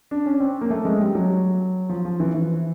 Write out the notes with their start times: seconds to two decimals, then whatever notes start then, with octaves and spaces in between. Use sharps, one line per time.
0.11 D4
0.26 C#4
0.40 C4
0.61 A#3
0.70 A3
0.85 G#3
1.00 G3
1.15 F#3
1.89 F3
2.05 F3
2.20 E3
2.34 E3